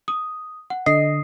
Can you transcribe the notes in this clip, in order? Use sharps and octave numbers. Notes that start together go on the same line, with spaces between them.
D#6
F#5
D3 D#5 C7